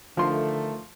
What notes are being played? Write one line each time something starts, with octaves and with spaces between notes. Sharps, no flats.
D3 D#3 F3 A3 C6